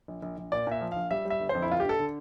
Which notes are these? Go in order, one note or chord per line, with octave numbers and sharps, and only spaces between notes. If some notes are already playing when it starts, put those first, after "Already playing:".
A#1
A#1
A#1
A#2 D5
A#2 E5
F3
A#1 F5
G3 E5
G3
E5
G1
C5
F2
E4
G1 F4
G4
D3 A4
D3